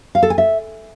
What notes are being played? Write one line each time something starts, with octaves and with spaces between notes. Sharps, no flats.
F5
A4
G#5
E5